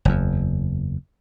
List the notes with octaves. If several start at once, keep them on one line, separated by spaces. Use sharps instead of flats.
F#1 E2